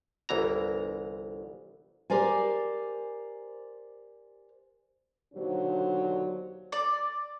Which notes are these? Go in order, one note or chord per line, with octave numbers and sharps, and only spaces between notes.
G1 C2 E3 A#5
G4 A#4 C5 D5 G#5
D#2 B2 D3 F#3 D4 C5
D5